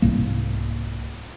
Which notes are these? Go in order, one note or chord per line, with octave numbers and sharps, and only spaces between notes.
C2 G#2 G3 A#3